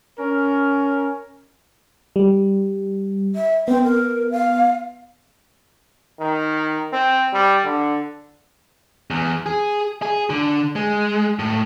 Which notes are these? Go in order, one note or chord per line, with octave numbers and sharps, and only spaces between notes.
C#4 A#4
G3
E5
B3 C4
A#4
F5
D#3
C4
G3
D3
E2
G#4
G#4
D3
G#3
A2